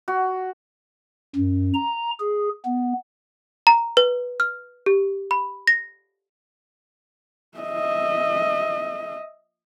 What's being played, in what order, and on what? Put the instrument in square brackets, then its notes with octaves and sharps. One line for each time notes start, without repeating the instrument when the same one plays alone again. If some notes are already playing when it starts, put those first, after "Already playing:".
[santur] F#4
[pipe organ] F#2
A#5
G#4
B3
[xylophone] A#5
B4
F6
G4
B5
A#6
[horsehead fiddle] D#5 E5